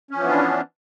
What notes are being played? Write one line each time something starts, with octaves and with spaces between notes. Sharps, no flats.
E3 F3 B3 C#4 D4